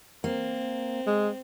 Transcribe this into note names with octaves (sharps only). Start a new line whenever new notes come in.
A#3 C4
G#3